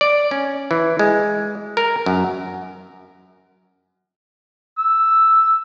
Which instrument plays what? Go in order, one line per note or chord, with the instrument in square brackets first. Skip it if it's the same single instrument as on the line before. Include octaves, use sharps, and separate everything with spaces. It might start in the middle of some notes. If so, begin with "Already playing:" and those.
[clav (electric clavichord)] D5
C#4
E3
G#3
A#4
F#2
[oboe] E6